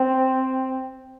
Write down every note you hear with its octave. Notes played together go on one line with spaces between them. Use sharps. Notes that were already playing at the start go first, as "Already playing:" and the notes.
Already playing: C4